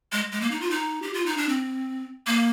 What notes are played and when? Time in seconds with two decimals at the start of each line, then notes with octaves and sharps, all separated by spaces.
0.12 G#3
0.32 G#3
0.41 A#3
0.51 D#4
0.61 F4
0.71 D#4
1.02 G4
1.13 F4
1.26 D#4
1.37 D4
1.49 C4
2.27 A#3